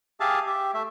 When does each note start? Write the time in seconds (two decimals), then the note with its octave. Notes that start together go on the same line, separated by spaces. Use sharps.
0.20 G4 G#4 E5 F5 A5
0.47 G4 E5
0.74 A3 E5